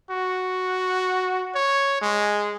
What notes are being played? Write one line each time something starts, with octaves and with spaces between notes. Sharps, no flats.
F#4
C#5
G#3